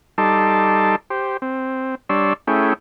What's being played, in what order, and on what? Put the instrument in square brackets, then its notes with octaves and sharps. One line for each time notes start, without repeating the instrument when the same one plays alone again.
[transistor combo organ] G3 D#4 A4 A5 C6 D6
G4 C5
C4
G3 D4 C#5 D5 C6 E6
A3 C#4 E4 G#4 G5